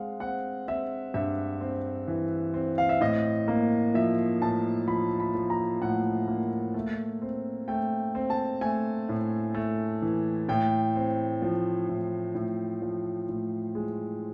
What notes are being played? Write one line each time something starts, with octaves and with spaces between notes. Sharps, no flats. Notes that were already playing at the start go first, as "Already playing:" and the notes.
Already playing: G#3 C4 F5 F#5
C4 F#5
C4 E5
G2 E5
C4
E3
C4
F5
E5
A2 D#5
A#3
F3 E5
A2 A5
F3 B5
B5
F3
A#5
A2 F#5
A#3
A3
C4
A3 G5
C4
A5
A3 G#5
A2
A3
E3
A2 G5
C4
F3
A2
A2
F3
A2
G#3